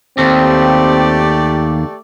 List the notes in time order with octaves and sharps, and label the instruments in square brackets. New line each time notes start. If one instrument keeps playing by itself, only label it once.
[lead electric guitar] D#2 [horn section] A3 G4 D5 [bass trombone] C4